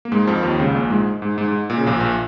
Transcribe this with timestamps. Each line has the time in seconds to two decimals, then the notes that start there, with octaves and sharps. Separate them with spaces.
0.05 A#3
0.12 G#2 G#3
0.27 F2 F3
0.43 D#2 D#3
0.59 C#2 C#3
0.75 A#1 A#2
0.90 G#2 G#3
1.22 G#2
1.38 G#2
1.48 G#2
1.70 A#2
1.78 C#3
1.87 A#1 A#2
2.00 A#1 A#2